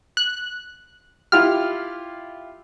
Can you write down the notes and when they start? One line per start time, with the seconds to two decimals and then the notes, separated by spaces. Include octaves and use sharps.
0.17 F#6
1.32 E4 F4 G4 F6